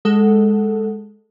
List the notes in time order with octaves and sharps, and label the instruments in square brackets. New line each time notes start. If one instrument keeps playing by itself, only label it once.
[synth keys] G#3 A4 F#5